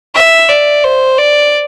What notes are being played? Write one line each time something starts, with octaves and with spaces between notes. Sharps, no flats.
E5
D5
C5
D5